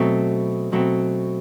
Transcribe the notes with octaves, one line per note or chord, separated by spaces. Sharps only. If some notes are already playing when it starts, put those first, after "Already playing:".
Already playing: B2 F#3 A3 C4
B2 F#3 A3 C4